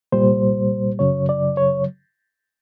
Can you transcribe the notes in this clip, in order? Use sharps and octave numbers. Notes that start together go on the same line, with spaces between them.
C2 A#2 G3 C5
F#2 C#3 F#3 C#5
D5
C#5